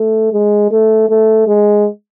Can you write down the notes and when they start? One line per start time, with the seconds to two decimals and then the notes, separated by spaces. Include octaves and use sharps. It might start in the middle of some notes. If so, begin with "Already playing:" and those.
Already playing: A3
0.33 G#3
0.71 A3
1.09 A3
1.47 G#3